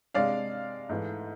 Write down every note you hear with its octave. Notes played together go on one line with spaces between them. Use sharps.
C3 G#3 D4 D5 F5
G#2 E3 A3